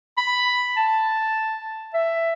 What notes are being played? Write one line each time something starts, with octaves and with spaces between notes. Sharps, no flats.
B5
A5
E5